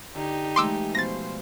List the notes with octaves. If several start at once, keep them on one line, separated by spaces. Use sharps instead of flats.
D3 D#4 G4
E3 G#3 A3 C6 D6 E6
B2 F3 C5 A6 A#6